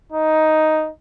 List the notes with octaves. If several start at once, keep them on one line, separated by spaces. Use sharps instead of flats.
D#4